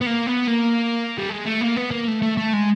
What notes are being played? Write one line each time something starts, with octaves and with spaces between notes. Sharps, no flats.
B3
A#3
B3
A#3
G3
G#3
A3
A#3
B3
A#3
A3
A3
A3
G#3